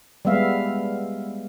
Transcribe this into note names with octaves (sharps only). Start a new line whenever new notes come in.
G3 G#3 B3 E5 F5